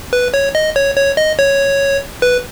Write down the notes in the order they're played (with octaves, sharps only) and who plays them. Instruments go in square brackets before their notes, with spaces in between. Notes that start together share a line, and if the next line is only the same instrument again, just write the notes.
[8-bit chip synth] B4
C#5
D#5
C#5
C#5
D#5
C#5
B4